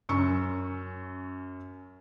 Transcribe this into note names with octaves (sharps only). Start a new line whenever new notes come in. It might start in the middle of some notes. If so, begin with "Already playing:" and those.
F#2 C#4 C#6 E6 C#7